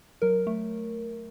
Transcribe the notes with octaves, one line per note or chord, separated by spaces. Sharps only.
F#3 A#4
A3